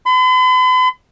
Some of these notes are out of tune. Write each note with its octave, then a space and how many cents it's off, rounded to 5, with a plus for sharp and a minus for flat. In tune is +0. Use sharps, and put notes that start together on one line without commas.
B5 +45